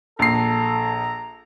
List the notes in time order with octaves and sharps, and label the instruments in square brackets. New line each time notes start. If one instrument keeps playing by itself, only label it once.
[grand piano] A#1 C7 [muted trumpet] A4 [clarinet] A#5